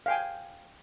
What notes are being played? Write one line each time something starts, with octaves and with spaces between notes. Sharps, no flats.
F5 G5 G#5